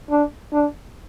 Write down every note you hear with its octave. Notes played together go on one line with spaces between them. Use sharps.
D4
D4